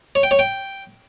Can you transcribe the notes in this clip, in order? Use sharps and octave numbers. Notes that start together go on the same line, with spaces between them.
C#5
G5
C#5
G5